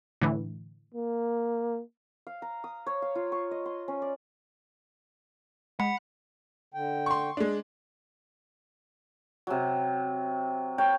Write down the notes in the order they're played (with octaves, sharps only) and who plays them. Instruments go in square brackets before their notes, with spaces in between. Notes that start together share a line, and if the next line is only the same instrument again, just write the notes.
[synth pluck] A2 D3 E3
[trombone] A#3
[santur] F5
A#5
D#6
C#5
F5
F4
C#6
D#5
C6
C#4
D5
[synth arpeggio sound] G#3 [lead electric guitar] F#5 [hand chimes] B5
[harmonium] D3 G5
[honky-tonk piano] C6 C#6
G#3 D4
[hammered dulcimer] C3 F#3
A#4 C#5 G5